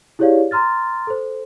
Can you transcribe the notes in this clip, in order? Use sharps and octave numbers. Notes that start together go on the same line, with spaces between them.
E4 G4 G#4 C#5 D5 F5
A#5 C6 F6 A6
A4 C5